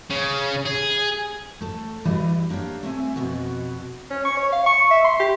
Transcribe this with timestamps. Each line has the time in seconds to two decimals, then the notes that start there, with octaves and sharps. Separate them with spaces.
0.11 C#3
0.66 G#4
1.61 A3 A4
2.05 E3 G3 E4 F#4 D5 D#5
2.49 A#3 D4 G4 C#5 F5
2.83 A3 C4 E5 G#5
3.16 F2 B2 B3 F#4
4.10 C#4
4.25 C#6
4.37 C#5
4.53 F5
4.66 C#6
4.90 E5
5.04 C6
5.20 G4